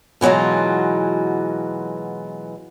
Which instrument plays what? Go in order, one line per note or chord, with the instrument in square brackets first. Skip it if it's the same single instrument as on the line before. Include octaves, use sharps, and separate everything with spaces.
[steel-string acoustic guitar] B2 E3 F#3 G#3 F4